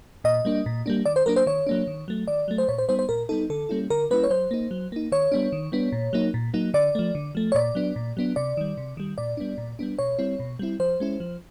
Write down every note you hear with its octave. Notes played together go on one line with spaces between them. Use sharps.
A#2 D#5
G3 A#3 D4
A#2
G3 A#3 D4
D#3 D5
C5
F#3 A#3 D4 A#4
C5
D#3 C#5
F#3 A#3 D4
D#3
F#3 A3
D#3 D5
F#3 A3
C5
A#2 C#5
C5
G3 B3 D#4 C5
C5
A#2 A#4
G3 B3 D#4 A4
D3 A4
G3 A#3 C#4 E4
D3 A#4
G3 A#3 C#4 E4 B4
C#5
F#3 C5
A#3 D#4
F#3
A#3 D#4
D#3 C#5
G3 B3 D4
D#3
G3 B3 D4
A#2
F#3 A#3 D#4
A#2
F#3 A#3 D#4
D3 D5
F3 A3
D3
F3 A3
C#5
A#2 D5
F#3 B3 D4
A#2
F#3 B3 D4
C3 D5
D#3 G3
C3
D#3 G3
A#2 D5
G3 B3 D4
A#2
G3 B3 D4
B2 C#5
G3 C4 E4
B2
G3 C4 E4
F3 C5
G#3 C#4 E4
F3